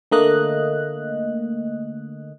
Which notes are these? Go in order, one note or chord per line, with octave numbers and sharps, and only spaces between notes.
D3 A3 A#3 D#5 F#6